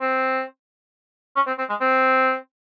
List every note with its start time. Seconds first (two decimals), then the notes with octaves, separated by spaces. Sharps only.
0.01 C4
1.36 C#4
1.47 C4
1.58 C4
1.70 G#3
1.81 C4